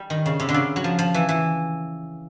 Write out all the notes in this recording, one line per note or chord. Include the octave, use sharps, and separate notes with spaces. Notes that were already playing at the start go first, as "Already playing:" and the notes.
Already playing: G3
D#3
C#3
C3
D3
C#3
F#3
F3
F3
E3
E3